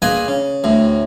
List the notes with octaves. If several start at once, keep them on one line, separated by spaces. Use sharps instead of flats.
A#2 G#4 B4 D#5 G#5
C#3
D2 A2